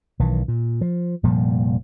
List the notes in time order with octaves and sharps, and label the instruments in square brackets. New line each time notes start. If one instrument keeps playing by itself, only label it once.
[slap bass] B1 D#3 E3
A#2
F3
F1 A#2 F3 G3